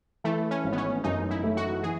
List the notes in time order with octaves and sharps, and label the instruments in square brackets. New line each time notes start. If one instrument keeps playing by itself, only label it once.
[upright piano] E3 [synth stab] A3
[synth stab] C#4
[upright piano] G#1
[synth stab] B3
C#4
[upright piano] F#2 [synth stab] D#4
[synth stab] E4
[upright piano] A3
[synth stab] F#4
[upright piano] E3 [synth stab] G#4